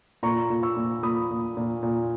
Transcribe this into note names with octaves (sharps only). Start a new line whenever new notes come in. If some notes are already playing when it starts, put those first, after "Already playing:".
A#2 A#5 C#6
A#2
C#6 E6
A#2
A#2 B5 D#6
A#2
A#2
A#2